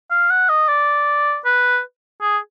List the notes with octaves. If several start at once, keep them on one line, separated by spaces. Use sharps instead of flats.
F5
F#5
D#5
D5
B4
G#4